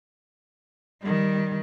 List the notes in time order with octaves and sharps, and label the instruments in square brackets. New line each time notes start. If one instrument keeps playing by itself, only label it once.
[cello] D#3 G3